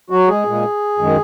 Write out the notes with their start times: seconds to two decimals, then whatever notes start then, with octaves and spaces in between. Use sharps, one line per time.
0.10 F#3 F#4
0.28 G#3 G#4
0.46 A#2 G#3
0.98 F#2 D#3 G#3